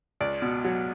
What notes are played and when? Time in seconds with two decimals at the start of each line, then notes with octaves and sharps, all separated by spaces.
0.20 C#2 D5
0.42 B2
0.64 F#3